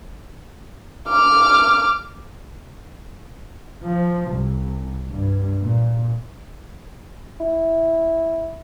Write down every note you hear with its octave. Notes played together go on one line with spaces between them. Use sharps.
D6 F6
F3
C2
G2
A#2
E4